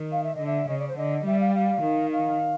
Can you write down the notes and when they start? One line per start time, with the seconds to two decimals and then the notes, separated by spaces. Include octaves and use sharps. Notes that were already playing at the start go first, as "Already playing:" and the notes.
Already playing: D#3
0.12 F5
0.23 E5
0.35 D3 D#5
0.46 E5
0.68 C#3 D#5
0.79 D5
0.88 C5
0.97 D3 D#5
1.26 G3 E5
1.40 F5
1.55 F5
1.83 D#3
2.12 F5